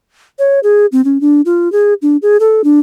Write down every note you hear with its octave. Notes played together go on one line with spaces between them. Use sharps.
C#5
G#4
C4
C#4
D4
F4
G#4
D4
G#4
A4
D4